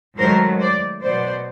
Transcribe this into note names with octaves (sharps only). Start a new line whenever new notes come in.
G#2 D#3 F#3 A3 A#4 C5
C5 D5
B2 F#3 B3 C5 D5